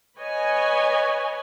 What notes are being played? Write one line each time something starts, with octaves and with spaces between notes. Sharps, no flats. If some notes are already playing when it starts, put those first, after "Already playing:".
B4 C#5 D#5 G#5